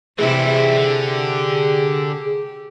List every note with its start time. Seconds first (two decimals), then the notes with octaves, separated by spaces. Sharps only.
0.19 C3 E3 G3 E4 G#4
0.76 D3 G4